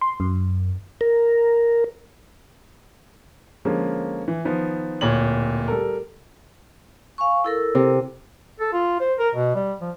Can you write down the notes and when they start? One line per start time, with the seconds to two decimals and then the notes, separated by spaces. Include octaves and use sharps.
0.01 C6
0.20 F#2
1.01 A#4
3.65 D3 F3 G#3 A#3 C#4
4.28 E3
4.45 D#3 F3 B3
5.01 D1 A#2 C#5 F#7
5.68 G3 A4 A#4
7.18 F5 G#5 C#6
7.44 E4 A4 A#4
7.75 C3
8.60 A4
8.73 F4
9.00 C5
9.19 A#4
9.35 B2
9.55 G3
9.81 F3